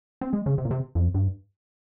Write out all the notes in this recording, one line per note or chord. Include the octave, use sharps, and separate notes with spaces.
C4
G#3
C#3
C3
A#2
C3
F2
G2